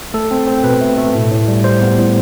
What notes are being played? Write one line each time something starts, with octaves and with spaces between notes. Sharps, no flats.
A3 A4
C4
C4
B2 B4
A3
A3
A2
A2
G3
G3 C5
B3
A2